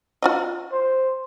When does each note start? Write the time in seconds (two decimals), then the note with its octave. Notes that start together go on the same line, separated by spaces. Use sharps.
0.22 F4 F#4 D#5
0.72 C5